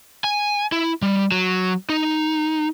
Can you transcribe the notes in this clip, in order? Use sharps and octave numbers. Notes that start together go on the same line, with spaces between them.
G#5
E4
G3
F#3
D#4